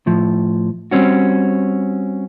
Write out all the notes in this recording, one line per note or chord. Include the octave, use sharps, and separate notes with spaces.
A2 F3
G3 C4 C#4 F#4